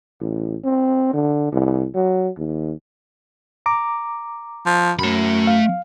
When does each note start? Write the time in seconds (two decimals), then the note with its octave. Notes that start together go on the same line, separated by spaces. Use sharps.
0.21 A1
0.64 C4
1.14 D3
1.53 C2
1.95 F#3
2.37 D#2
3.66 A#5 D6
4.66 F3
4.99 F#2 A3 B5
5.47 F5